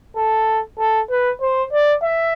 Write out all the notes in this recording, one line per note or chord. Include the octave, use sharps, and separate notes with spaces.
A4
A4
B4
C5
D5
E5